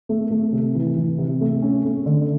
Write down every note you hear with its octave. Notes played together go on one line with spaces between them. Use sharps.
A3
A3
C3
E3
E3
C3
A3
C#4
A3
D3